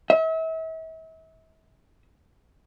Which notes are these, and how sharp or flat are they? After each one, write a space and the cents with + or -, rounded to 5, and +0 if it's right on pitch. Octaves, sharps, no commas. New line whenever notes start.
E5 -40